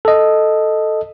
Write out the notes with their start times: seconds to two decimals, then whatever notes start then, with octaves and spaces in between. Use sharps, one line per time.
0.05 A4 D#5